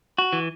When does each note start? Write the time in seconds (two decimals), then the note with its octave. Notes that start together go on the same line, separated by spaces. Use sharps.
0.18 F#4
0.33 E3